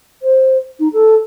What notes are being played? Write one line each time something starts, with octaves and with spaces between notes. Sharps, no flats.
C5
D#4
A4